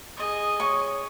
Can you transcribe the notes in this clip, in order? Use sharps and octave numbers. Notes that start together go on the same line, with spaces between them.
G#4 D#5
C#5 C#6